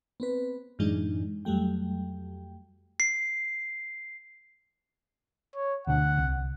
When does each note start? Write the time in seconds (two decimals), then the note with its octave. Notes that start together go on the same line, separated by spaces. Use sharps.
0.20 B3 C4 B4
0.79 F#2 A2 E3 G#3 D4 D#4
1.45 F2 F#3 G3 A3 G5
3.00 C7
5.55 C#5
5.87 D2 B2 D4 F#5
6.18 C2